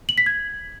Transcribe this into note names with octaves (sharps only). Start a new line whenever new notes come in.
F#7
B6
G#6